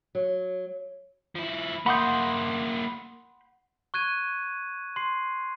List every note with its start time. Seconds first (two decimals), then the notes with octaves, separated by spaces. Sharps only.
0.15 F#3
1.35 F3 E4
1.86 A#3 E4 F#5 B5 C6 D6 D#6 G6
3.94 C#6 F#6 G#6 D#7
4.96 C6 C7